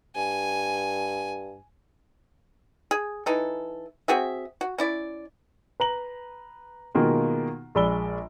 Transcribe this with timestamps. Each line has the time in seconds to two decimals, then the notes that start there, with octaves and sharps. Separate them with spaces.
0.16 G2 G#5
2.91 G#4
3.26 E3 D#4 A4
4.08 C4 F#4 G#4 E5
4.61 F#4
4.78 C#4 E4 D5
5.80 B4 A#5 F#7
6.95 B2 D#3 G#3 A#3 D#4 F4
7.75 A#1 G#3 D5 B5 E6 G7